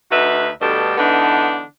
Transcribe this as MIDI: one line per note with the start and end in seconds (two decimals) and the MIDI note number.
0.12 0.50 38
0.12 0.50 63
0.12 0.50 66
0.12 0.50 71
0.12 0.50 76
0.62 0.95 38
0.62 0.95 43
0.62 0.95 47
0.62 0.95 67
0.62 0.95 69
0.98 1.63 50
0.98 1.63 52
0.98 1.63 59
0.98 1.63 62
0.98 1.63 63